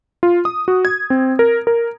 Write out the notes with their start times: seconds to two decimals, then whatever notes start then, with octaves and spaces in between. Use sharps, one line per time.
0.23 F4
0.45 D#6
0.68 F#4
0.85 G#6
1.10 C4
1.39 A#4
1.67 A#4